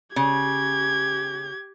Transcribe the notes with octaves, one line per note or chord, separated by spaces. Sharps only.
C#3 G4 G#6